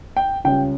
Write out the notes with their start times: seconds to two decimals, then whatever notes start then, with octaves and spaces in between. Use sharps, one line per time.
0.17 G5
0.45 C#2 C#3 G3 C#4 G5